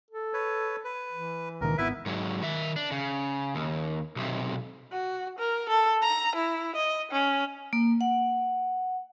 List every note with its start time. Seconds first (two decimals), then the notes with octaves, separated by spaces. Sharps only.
0.11 A4
0.34 B4 C#5
0.84 B4
1.12 E3
1.61 C#2 A#2 D#3 A#4
1.78 G#1 B3 E4 B4 E5
2.06 G#2 F#3
2.43 D#3 E5
2.76 D4
2.91 C#3
3.55 D#2
4.16 B1 C3
4.92 F#4
5.39 A#4
5.69 A4
6.02 A#5
6.35 E4
6.76 D#5
7.11 C#4
7.73 A#3
8.01 F#5